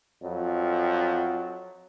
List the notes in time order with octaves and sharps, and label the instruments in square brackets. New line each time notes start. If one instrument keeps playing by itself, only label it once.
[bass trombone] F2 [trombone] F#3